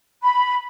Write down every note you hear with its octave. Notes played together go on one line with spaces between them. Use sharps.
B5